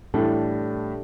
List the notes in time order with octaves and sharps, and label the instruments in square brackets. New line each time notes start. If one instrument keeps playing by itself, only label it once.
[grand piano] A2 E3 [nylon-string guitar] G3 D4 A4